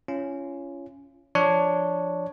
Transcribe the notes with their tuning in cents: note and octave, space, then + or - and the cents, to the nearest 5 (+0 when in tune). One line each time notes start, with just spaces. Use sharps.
C#4 +5 F4 -35
F3 -10 D4 +0 C#5 +0